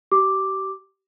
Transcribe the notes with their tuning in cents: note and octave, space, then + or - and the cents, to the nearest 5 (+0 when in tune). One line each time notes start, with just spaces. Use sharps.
G4 -35 D6 +0